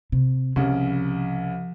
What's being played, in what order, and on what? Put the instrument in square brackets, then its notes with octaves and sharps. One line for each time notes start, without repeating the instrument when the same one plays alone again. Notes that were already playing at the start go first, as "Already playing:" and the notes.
[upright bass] C3
[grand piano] C2 C#3 [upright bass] F3